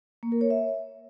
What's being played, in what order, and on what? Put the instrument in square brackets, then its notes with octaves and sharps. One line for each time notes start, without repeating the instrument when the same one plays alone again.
[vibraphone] A#3
A#4
C#5
E5